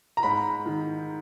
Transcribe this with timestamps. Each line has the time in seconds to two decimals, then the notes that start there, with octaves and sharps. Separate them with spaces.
0.17 A#5
0.23 G#2 B5
0.66 D#3